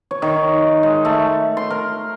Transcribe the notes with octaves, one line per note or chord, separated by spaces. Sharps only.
C#5
D#3
G#3
A3
C6
A#4